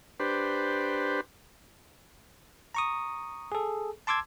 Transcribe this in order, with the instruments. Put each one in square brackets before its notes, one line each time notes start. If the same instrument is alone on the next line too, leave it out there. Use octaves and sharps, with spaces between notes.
[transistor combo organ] D4 G4 B4 C5
[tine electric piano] A#5 C#6 D#6
G#4 A4
A5 C6 D6 E6 G#6